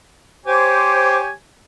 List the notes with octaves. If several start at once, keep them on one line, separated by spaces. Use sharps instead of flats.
G4 C5 C#5 G#5 D6